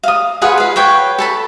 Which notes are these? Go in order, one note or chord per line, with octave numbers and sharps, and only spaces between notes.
F5 D#6
F4 G#4 B4 F#5
B4 F5
B4 C#5 G5
A4 A5 B5